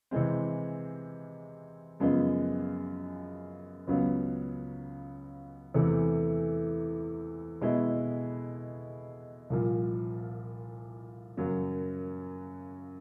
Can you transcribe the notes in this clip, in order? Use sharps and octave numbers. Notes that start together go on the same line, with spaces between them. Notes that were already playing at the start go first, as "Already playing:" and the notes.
C3 E3 G#3 C4
F#2 C#3 F3 G#3 B3
C#2 C#3 F#3 B3
E2 C3 E3 A3
B2 G#3 B3 E4
C2 A#2 F3
F#2 C#3 F#3 A#3